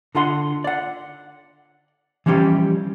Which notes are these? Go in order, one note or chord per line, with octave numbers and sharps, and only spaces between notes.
D3 D4 F4 F#5 C6
D5 F#5
E3 F3 G3 C#4 G4